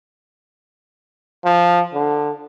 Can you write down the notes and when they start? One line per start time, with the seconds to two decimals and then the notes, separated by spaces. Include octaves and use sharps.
1.45 F3
1.94 D3